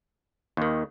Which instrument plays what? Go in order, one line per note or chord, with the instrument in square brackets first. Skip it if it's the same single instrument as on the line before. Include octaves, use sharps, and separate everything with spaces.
[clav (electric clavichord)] D#2 D#3